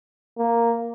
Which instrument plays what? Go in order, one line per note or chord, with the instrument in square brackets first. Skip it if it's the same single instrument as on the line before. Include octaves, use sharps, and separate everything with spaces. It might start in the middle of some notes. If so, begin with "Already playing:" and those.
[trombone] A#3